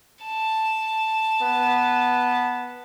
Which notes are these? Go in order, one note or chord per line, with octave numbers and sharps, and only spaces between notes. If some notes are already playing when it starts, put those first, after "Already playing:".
A5
B3